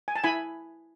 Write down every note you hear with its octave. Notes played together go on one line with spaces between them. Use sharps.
G#5
A5
E4 G#5 B5